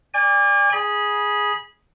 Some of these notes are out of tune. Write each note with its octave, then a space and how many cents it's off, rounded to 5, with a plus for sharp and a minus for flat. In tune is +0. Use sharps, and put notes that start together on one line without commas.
D5 -5 G#5 -40
G#4 +0 B5 -25